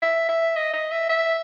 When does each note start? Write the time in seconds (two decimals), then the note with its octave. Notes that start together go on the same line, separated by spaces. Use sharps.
0.02 E5
0.29 E5
0.56 D#5
0.74 D#5
0.91 E5
1.09 E5